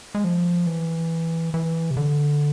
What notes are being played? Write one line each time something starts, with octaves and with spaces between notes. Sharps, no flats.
G#3
F3
E3
E3
C3
D3